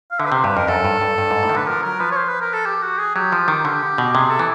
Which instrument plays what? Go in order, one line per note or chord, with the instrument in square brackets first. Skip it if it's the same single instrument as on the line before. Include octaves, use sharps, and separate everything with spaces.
[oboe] F5
[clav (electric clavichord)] D3 [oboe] E5
[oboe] B4
[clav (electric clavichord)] C3 [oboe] C5
[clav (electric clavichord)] G2 [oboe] B4
[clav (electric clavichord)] F2 [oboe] A#4
[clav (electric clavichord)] F#2 [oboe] A4
[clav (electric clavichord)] G2
G2
G2
G#2
A2
D#3
[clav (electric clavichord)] D3 [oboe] B4
[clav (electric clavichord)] F3 [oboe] A#4
[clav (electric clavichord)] F#3 [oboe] A#4
[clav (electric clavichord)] F3 [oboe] B4
[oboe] C#5
C5
B4
A#4
A4
G4
F#4
G#4
[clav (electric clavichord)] F#3 [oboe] G4
[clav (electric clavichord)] F3
D#3
D3
B2
[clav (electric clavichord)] C3 [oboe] G#4
[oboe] A4
[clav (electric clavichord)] E3